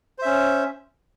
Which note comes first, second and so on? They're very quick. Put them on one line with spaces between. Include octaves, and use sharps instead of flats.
C5 E5 C#4